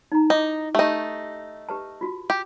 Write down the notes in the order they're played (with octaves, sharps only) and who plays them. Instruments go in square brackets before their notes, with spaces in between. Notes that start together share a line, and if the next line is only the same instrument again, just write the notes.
[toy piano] D#4 A#5
[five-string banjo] D#4 [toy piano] E4 D6
[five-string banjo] A3 D#4 [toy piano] G4
[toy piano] G4 B4 A5
F4 F#4
[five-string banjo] G4